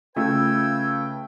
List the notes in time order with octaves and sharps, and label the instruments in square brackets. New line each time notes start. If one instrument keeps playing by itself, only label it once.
[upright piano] C#3 A3 F4 [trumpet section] B4 G5 [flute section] E6 G#6